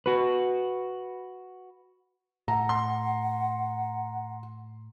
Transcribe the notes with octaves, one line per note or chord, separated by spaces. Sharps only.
F#4 B4
A2 F#5 A#5
C6